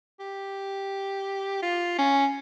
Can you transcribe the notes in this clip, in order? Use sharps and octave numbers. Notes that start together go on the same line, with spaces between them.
G4
F4
C#4